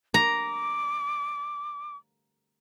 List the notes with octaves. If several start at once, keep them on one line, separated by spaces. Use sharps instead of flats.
A#5 D6